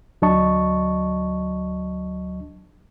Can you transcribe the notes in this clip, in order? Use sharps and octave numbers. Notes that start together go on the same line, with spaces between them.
D2 F#3 D4 D#5 A5 C#6